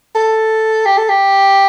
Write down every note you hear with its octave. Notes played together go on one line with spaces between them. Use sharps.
A4
G4
A4
G4